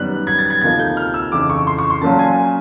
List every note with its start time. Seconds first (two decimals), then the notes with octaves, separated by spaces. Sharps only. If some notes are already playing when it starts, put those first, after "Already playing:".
Already playing: F#2 D#3 G3 B3 F#6
0.27 G#6
0.38 A6
0.50 G#6
0.61 D2 C3 F3 A#3 D#4 G#6
0.79 G6
0.97 F6
1.14 E6
1.32 F2 C#3 E3 D6
1.50 C#6
1.67 C6
1.78 C#6
1.90 C6
2.01 A#2 F#3 A#3 C#4 A5
2.19 G#5